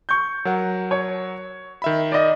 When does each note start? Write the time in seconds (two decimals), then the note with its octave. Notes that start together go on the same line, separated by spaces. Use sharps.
0.09 C#6 G6
0.45 F#3 A#4 F#5
0.91 C#5
1.82 D#3 E5 B5
2.12 D5 D#5